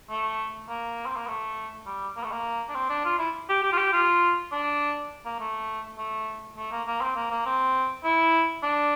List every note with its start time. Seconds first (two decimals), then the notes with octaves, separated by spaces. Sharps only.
0.10 A3
0.69 A#3
1.06 C4
1.16 A#3
1.27 A3
1.86 G3
2.17 A#3
2.24 A3
2.32 A#3
2.69 D4
2.75 C4
2.90 D4
3.05 F4
3.19 E4
3.49 G4
3.63 G4
3.73 F4
3.78 G4
3.92 F4
4.52 D4
5.25 A#3
5.40 A3
5.98 A3
6.57 A3
6.72 A#3
6.88 A#3
7.01 C4
7.16 A#3
7.31 A#3
7.46 C4
8.04 E4
8.63 D4